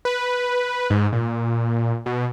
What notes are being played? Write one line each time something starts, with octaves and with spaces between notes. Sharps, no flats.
B4
G#2
A#2
B2